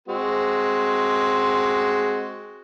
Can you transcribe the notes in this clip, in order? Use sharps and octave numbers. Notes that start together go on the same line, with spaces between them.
G#3 C4 F#4